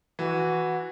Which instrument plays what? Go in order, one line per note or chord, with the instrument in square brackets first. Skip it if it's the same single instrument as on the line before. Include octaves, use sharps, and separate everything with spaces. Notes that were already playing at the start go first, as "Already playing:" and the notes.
[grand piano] E3 [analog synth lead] F#4